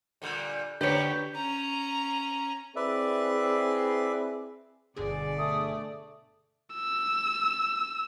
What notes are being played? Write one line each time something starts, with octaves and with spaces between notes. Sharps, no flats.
A#2 D3 G3
D3 A3 G4 B4 C#5 D5
C#4 A#5
C4 E4 G#4 B4 D5 E5
G1 B2 D3 G#4 D5
A3 D#6
E6